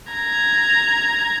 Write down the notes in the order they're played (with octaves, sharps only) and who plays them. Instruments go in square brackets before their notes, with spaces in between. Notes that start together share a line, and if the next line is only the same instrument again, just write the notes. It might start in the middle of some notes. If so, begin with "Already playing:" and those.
[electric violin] A#5 G#6